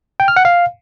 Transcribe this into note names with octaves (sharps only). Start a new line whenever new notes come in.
G5
F6
F#5
F5